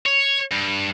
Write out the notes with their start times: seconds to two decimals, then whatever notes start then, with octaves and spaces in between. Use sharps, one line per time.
0.06 C#5
0.51 G2